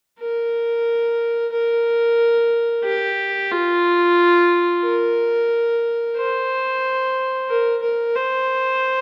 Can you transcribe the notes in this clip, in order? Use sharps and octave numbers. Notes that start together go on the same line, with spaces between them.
A#4
A#4
G4
F4
A#4
C5
A#4
A#4
C5